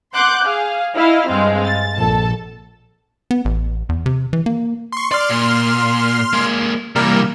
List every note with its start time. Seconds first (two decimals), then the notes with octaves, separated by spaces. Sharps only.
0.14 F#5 C6 D6 F#6 G6
0.43 G#4 F5
0.95 E4 D#5 F5
1.29 G2 G#3 C4 F5
1.65 A6
1.95 A#1 A4 A5
3.31 B3
3.45 A1
3.89 E2
4.06 C3
4.33 E3
4.46 A#3
4.92 C6 C#6
5.11 D5 C6 F6
5.29 A#2
6.33 G#3 A#3
6.96 C3 E3 G3 A#3 A#4